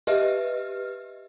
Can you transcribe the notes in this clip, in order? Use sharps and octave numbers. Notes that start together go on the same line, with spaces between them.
G4 B4 D#5 E5 F6